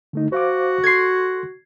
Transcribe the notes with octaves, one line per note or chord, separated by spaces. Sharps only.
D3 A3 D#4
F#4 C5 F5 D6
A4 C6 G#6 C7